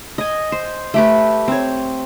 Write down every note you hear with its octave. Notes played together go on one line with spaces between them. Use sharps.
D#5 G#5
C5
A3 G4 B4
C4 C#5